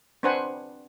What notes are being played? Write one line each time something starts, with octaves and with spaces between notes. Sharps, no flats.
C4 D4 B4 C5 F#5 G#5